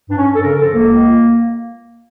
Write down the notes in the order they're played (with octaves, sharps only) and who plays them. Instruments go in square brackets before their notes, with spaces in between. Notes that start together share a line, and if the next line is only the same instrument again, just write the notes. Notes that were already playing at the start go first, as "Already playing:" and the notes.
[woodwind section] G2 D4
C#4
G2
A4
C#3 A#4
F3 A4
C#2 A#3
C#2